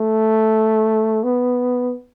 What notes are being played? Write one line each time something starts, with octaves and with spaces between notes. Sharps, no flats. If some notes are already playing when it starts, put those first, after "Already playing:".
Already playing: A3
B3